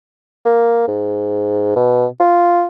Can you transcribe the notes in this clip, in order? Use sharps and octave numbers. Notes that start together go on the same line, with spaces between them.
A#3
G#2
B2
F4